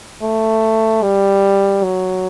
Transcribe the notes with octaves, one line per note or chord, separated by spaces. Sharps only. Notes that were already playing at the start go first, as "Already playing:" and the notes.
A3
G3
F#3